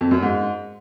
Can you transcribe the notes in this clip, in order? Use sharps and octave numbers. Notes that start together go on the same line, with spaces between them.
F2
F#2
G#2